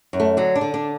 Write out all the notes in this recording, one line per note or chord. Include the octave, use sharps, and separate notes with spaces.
F#2
A3
D3 F#3
D4
D3
D4